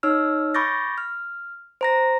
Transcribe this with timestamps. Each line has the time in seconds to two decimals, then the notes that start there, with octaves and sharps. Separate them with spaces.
0.03 D#4 C#5 E6 F6
0.54 B5 C#6 D6 G6 A6 A#6
0.98 F6
1.81 C5 A#5 A#6